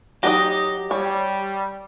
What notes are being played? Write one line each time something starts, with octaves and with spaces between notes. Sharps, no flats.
F#3 D#4 G4 D#5
G3 C#5